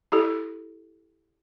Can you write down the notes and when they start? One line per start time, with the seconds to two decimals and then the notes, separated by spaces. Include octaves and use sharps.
0.12 E4 G4 A4